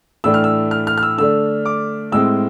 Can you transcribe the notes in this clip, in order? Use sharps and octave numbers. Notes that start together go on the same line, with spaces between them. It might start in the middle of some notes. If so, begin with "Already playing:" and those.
A2 E3 A3 D4 E6
F6
E6
F6
F6
F6
E6
D3 A3 D4 E6
D6
A2 G#3 C4 E6